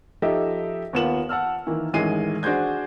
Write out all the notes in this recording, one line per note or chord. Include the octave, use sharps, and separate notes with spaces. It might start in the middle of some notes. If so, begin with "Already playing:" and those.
F3 D#4 G4 A4 D#5 E5
D#2 A#3 B3 F4 E7 F#7
F#5 A5 E6 F6
D#3 E3 A#3
A1 D#3 E3 G#3 C7 D#7
D4 F#4 G#4 C5 G6 G#6